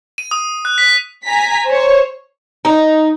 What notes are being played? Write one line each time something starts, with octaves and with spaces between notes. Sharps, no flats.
D#7
D#6
F#6
B6
G#5 A#5 B6
C5 C#5
D#4